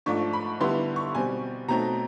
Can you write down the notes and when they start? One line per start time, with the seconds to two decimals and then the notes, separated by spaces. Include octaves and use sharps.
0.06 G#2 F3 A3 D4 C#6
0.33 B5
0.60 D3 G3 B3 E4 C6
0.96 C#6
1.15 B2 G3 C4 G#5
1.68 B2 F#3 A3 C4 D#4 A#5